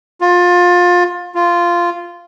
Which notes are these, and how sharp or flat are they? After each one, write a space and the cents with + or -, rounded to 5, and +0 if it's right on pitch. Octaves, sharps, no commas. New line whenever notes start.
F4 +25
F4 -10